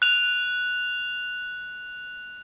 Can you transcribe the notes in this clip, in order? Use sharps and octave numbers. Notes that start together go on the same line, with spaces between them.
F#6 F7